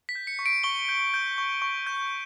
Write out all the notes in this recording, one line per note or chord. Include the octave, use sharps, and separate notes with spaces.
B6
G6
C#7
C#6
D7
C#6 G7
G6
G6
C#6
C#6
G6